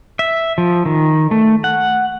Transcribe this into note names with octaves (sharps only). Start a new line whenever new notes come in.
E5
F3
D#3
A3
F#5